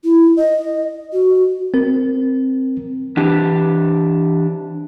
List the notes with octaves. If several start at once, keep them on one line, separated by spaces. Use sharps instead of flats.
E4
D#5
F#4
C4 A#4
E3 D4 G4